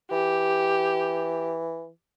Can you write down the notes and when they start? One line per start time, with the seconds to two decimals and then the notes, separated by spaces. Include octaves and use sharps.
0.12 E3 G4